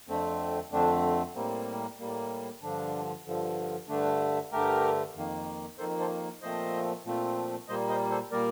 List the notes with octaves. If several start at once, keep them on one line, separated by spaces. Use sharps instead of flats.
F2 D3 A3 C4
F2 D3 A3 C4 D4
A2 G3 A#3 C4
A2 G3 A#3
G2 D3 F3 D4
G2 D3 F3
G2 D3 A3 D4
G2 D3 A3 G4 A#4
F2 D#3 A#3
F2 D#3 A#3 A4 C5
A4 C5
A#2 F3 A3 C4 C5 D#5
A#2 F3 A3 C4
A#2 G3 A#3 C5 D#5
C5 D#5
A4 C5
A#2 G3 A#3 A#4 D5